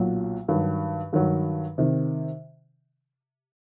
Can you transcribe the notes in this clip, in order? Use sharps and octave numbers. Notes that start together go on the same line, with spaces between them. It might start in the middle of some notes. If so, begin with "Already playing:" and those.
Already playing: B1 A#2 F#3
G2 D#3 F#3
G2 D#3 F#3
C3 D#3